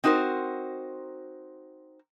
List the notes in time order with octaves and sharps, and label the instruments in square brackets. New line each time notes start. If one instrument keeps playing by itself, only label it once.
[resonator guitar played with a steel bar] C4 D#4 F#4 A#4 C5